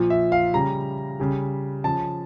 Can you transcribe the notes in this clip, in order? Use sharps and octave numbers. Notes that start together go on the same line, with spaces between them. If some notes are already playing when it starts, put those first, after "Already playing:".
Already playing: A#2 F3
E5
F5
C#3 G3 A#5
C#3 G3
C#3 F3 A5